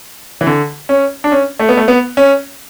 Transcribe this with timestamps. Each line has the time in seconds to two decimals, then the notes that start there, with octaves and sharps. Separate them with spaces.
0.41 E3
0.47 D3
0.89 C#4
1.24 D4
1.32 C#4
1.59 A3
1.69 B3
1.77 A3
1.88 B3
2.17 C#4